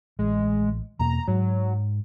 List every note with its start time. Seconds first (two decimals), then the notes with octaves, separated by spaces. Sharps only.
0.19 A1 G#3
0.99 E2 B2 A#3 A#5
1.28 G#2 F#3